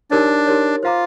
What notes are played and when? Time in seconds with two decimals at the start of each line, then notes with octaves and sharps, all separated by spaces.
0.11 D4 D#4 G4 A#4 C#5
0.47 D#4 G4 A#4 C#5
0.83 F4 C5 F5 A#5 D6